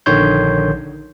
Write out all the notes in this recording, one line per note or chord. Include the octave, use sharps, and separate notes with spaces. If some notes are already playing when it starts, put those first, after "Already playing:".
A#1 D3 D#3 C#5 C6 G6